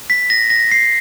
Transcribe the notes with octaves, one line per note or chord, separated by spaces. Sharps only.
B6
A#6
A#6
C7